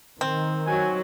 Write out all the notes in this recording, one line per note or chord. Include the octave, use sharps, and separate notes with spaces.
D#3 C4
F#3 G#5